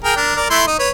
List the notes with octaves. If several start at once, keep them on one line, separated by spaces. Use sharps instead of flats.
G#4 A#4 G5
D4 A#4
A#4 D5
A3 E4 C6
D#4 D#5
B4 C#5